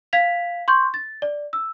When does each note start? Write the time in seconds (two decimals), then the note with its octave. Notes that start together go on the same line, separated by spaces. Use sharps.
0.13 F5 G#6 B6 F7
0.68 C6 C#6 G6
0.94 A6
1.22 D5
1.53 E6